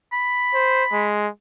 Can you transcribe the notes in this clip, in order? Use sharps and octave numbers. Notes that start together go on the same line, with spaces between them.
B5
C5
G#3